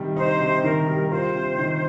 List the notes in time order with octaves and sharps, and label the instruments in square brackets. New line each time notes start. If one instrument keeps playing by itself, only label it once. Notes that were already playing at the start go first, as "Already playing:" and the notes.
Already playing: [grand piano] C3 D#3 G3
[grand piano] D#4 [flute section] C5
[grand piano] C3
[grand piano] D#3 [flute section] A#4
[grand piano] G3
[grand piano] F4 [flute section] C5
[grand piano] C3
D#3